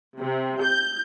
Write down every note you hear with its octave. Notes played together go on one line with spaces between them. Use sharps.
C3
G6